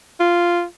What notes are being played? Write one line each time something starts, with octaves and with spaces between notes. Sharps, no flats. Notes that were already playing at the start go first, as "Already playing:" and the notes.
F4